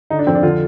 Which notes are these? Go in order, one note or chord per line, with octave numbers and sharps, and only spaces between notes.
D3 D#4
D4
F2 C4
D4
D3 F4